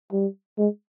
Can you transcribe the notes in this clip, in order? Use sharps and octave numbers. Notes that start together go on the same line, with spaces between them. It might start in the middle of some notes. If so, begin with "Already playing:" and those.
G3
G#3